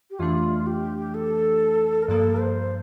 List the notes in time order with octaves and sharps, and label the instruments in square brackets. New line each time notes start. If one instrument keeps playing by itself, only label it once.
[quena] G4
[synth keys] F2 E3 A3 D4 [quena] F4
[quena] G4
A4
A#4
[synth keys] G2 F3 A#3 [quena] A4
[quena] C5